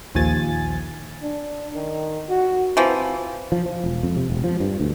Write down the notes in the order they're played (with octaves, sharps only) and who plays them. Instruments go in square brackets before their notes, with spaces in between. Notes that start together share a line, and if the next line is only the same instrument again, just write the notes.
[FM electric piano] A#1 D#2 F3 G#5 A6
[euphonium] D4
D#3
F#4
[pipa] E3 F3 [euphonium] C4
[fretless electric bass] F3
F3
E1
F2
C3
E1
F3
G2
D2